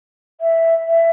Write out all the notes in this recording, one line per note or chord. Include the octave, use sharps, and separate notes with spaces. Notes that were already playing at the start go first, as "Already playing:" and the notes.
E5
E5